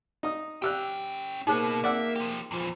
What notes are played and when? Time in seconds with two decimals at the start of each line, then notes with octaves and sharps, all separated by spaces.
0.23 D#4 D#6
0.62 C#4 G4 G5 E6 F#6
1.47 B2 A#3 D#4 G#4 C5
1.84 D5 E5 F#5 E6
2.16 F3 G4
2.51 E2 A#2 F3